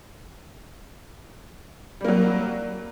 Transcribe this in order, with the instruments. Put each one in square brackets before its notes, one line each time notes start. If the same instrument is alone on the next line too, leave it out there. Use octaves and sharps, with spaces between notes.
[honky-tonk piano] G3
A#3
F#3